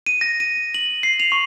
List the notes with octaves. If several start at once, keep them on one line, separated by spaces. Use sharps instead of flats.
D#7
A#6
D#7
F#7
C7
F7
C#6